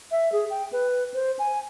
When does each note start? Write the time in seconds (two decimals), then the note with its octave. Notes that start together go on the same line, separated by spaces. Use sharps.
0.11 E5
0.32 G#4
0.50 G5
0.72 B4
1.14 C5
1.39 G#5